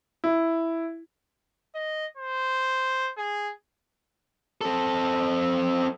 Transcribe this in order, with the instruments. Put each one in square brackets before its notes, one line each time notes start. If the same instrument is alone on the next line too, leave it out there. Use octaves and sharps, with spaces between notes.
[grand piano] E4
[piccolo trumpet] D#5
C5
G#4
[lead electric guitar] C4 A4